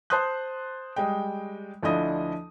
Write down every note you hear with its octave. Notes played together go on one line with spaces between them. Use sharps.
C5 A5 C6 D#6 F#6
G3 G#3 D#5 G5
D2 F3 D4 E4 D#5 D#6